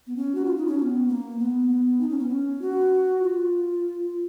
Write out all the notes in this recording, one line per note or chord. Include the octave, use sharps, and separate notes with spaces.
B3
C#4
F#4
F4
D#4
C#4
C#4
B3
A#3
B3
D#4
C#4
B3
C#4
F#4
F4